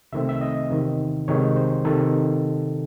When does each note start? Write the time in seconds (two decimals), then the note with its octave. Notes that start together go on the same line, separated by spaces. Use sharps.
0.12 C2 C3 D#3 A3 C4 E5
0.29 E5
0.41 D#5
0.70 E2 C3 D#3
1.28 C2 C3 D#3 G#3 D#4 C#5
1.56 C5
1.85 C3 D#3 A4